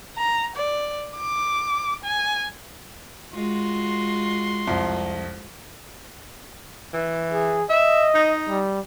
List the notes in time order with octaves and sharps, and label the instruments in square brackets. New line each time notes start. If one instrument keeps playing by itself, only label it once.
[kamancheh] A#5
D5
D6
G#5
[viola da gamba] G#3 F4 F#4 [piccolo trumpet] C6
[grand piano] C2 F2
[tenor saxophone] E3
[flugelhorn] G#4
[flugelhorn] D#5 [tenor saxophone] E5
[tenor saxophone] D#4
[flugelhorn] G3